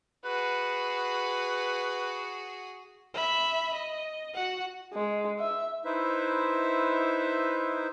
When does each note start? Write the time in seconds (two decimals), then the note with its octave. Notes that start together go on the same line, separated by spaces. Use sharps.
0.25 F#4 G#4 B4
3.14 E5 B5
3.74 D#5
4.34 F#4 F#5
4.94 G#3
5.39 E5
5.85 D#4 E4 B4 C5 E5